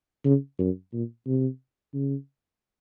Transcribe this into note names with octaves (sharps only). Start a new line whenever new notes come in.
C#3
F#2
A#2
C3
C#3